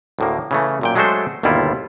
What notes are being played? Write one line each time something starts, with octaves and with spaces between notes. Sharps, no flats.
D2 A2 A#3
C#3 E3 A3
F#2 A#2 G5
F#3 G#3 A3 D4 A4 C5
G1 D#2 B2 G3 E4 F4